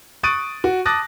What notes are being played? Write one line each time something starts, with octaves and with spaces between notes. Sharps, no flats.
C#6 D#6 F#6 A6 D7 D#7
F#4
A5 D6 D#6 F#6 A6 A#6